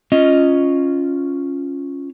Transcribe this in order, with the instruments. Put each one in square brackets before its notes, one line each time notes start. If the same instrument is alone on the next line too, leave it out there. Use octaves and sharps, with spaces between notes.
[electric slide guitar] C#4 F4 D#5